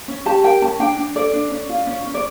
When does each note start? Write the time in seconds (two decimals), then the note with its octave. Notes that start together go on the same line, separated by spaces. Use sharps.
0.08 C#4
0.26 G4 A5
0.44 A#4 G5
0.62 C#4 A5
0.80 D4 G5
0.97 D4
1.15 A4 D5
1.33 D4
1.51 C#4
1.69 F4
1.87 C#4
2.05 C#4
2.14 D5